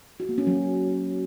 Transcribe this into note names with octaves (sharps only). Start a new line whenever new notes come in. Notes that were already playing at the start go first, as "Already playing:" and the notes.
F#4
A#3
C#4
F#3